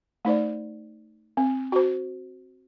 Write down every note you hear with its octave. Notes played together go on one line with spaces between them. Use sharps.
A3 D#4 C5 D5
C4
F#4 C5